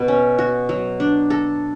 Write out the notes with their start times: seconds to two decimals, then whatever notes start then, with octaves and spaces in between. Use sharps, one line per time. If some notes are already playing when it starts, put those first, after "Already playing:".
Already playing: B2 B3
0.08 C#4
0.38 F#4
0.69 F#3
1.00 D4
1.30 A4